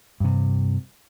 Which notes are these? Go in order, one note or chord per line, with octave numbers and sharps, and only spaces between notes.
G2 C3